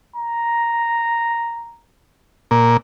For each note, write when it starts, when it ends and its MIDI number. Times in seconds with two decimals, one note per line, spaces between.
0.16 1.80 82
2.51 2.77 46